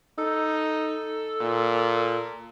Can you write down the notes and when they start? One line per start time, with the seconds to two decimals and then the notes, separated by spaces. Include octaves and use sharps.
0.19 D#4 A4
1.41 A#2